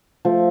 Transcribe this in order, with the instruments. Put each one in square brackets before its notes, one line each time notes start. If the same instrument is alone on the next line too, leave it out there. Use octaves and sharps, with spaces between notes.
[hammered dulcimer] F3 A3